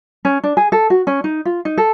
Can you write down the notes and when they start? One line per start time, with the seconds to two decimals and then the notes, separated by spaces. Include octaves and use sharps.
0.25 C#4
0.44 D4
0.57 G#4
0.72 A4
0.90 F#4
1.07 C#4
1.24 D#4
1.45 F4
1.65 D#4
1.78 A4